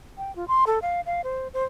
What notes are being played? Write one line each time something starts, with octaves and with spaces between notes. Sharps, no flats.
G5
F4
C6
A4
F5
F5
C5
C5